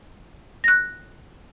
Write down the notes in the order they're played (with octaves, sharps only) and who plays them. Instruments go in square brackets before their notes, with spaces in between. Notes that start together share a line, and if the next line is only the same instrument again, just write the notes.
[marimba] F#6 A#6